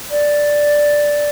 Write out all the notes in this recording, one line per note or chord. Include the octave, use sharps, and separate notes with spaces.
D5